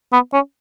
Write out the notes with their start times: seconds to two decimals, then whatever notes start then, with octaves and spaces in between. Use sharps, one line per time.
0.13 B3
0.33 C#4